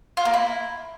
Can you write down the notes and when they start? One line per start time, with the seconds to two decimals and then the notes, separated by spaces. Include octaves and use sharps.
0.17 F4
0.25 A#3
0.34 E4